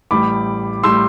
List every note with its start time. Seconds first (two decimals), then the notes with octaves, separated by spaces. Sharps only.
0.11 A1 A2 G3 B5 D6
0.83 A2 G3 C6 E6